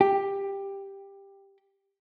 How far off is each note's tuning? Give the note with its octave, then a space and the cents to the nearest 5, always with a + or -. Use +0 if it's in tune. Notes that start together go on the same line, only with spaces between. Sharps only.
G4 +10